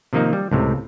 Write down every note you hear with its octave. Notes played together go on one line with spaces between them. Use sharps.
C3 D#3 F3 A#3 D#4
G3
C#2 A2 C3